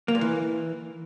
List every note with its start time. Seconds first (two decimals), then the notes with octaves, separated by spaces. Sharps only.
0.08 A#3
0.15 A#2
0.21 E3